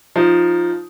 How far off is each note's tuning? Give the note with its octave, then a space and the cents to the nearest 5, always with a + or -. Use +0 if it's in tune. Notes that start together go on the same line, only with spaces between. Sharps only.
F3 +0 D#4 +0